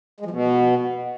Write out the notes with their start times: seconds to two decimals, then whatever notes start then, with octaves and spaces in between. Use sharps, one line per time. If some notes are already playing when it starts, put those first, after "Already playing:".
0.20 G#3
0.25 F3
0.31 B2